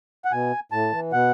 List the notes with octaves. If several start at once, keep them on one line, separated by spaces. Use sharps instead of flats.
F#5
B2 G#5
A2 A5
E3
B2 F#5